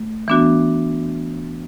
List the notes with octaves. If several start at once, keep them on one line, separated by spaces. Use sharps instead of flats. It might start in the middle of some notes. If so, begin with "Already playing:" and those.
Already playing: A3
E3 B3 D4 F#4